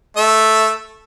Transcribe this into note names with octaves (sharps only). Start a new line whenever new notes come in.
A3 E5